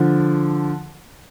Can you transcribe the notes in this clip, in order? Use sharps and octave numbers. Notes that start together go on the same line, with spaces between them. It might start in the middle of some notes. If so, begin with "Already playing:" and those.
Already playing: D3 F3